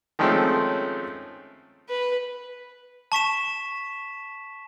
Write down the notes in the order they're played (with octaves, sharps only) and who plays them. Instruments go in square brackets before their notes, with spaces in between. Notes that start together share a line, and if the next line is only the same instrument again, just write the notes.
[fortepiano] D#3 F3 G#3 A3 C4 C#4
[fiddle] B4
[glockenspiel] A5 C#6 B6 E7